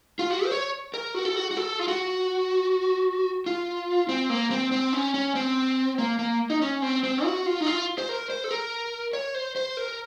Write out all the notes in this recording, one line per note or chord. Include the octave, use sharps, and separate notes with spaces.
F4
F#4
C5
C#5
A#4
F#4
A4
F#4
F#4
A4
F4
F#4
F4
C4
A#3
C4
C4
C#4
C#4
C4
A#3
A#3
D#4
C#4
C4
C4
F#4
F4
D#4
F4
C5
A#4
C5
A4
A#4
C#5
C5
C5
A#4